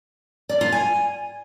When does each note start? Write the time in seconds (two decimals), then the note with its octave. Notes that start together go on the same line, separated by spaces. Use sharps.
0.49 D5
0.61 F4
0.72 G#5